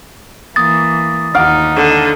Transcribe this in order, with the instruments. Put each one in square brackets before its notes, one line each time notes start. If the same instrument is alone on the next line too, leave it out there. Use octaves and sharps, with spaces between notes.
[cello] E3 A#3 [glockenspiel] D#6 A6
[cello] D#2 D#4 [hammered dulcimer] F5 F#5 D6
[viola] D3